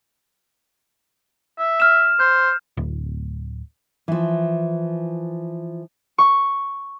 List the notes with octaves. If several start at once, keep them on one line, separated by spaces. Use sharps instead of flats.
E5
F6 E7
C5 G6
D1
E3 F3
C#6